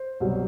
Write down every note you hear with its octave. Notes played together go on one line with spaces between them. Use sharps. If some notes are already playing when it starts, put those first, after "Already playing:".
Already playing: C5
C2 B2 F#3